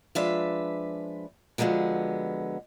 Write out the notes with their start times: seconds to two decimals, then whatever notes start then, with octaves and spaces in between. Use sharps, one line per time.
0.15 F3 G#3 D4 B4 E5
1.58 D3 F3 F#3 G#3 B3